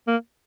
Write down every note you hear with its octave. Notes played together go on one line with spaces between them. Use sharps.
A#3